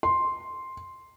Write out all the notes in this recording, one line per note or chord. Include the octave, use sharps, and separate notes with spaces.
C6